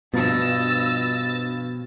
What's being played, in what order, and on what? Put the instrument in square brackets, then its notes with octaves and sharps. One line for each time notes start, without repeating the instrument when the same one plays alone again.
[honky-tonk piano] G2 F3 [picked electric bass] B2 [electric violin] D#5 E6 [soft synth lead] A6